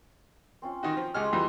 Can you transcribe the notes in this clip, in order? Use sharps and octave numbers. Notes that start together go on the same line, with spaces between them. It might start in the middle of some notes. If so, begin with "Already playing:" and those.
C4 C#4 F4
D#3 D#4 F#4
F3
C#2 G#3 C#4 G4 D6 F6
F2 E3 G3